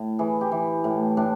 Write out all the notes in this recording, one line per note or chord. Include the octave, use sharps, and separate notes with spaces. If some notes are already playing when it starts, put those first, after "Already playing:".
Already playing: A2
E3 G#4
G4
E3
A2
A2 D4